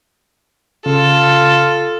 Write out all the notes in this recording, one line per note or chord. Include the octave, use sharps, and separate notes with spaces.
C#3 F4 A4